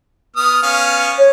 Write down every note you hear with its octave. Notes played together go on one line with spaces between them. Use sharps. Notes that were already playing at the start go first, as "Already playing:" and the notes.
B3 D#6 F6
B3 C#4 F5
C#5